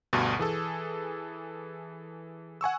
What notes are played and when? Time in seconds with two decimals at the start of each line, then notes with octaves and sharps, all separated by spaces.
0.13 D2 G2 B2
0.39 E3 G#4 A4
2.61 F#5 G#5 C#6 E6